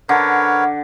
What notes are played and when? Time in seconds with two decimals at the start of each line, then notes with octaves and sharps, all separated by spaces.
0.09 D3 A#4 B4 C#5 F#5